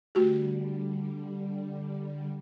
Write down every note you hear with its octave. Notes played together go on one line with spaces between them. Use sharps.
D3 G3 A3 F#4 G4